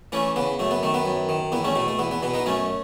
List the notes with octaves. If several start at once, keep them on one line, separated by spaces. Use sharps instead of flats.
E3 A3 C#4
C#3 B3
F#2 A3
B3
D#3 A3
B3
F#2
D#3
E2 B3
A3 C#4
B2 A3
A3
E2 B3
B3
B2 B3
B3 D#4
F#2 A3 C#4